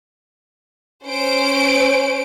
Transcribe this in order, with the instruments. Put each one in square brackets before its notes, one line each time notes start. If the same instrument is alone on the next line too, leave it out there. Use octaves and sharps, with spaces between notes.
[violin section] C#4 C5 D7